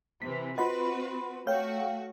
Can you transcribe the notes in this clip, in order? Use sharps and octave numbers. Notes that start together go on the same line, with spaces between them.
C3 E3 B6
C4 F4 F#4 B4 D#5 F#5 B5 C6
A3 F#4 C#5 F5 G5